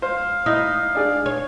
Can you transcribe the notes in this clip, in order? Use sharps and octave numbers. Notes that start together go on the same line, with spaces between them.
C5 F5
D#4 E4
D4 G#4 D5
C#5